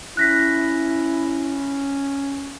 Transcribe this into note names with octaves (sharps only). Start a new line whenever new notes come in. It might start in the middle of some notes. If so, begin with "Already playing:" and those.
C#4 E4 F#6 A#6 B6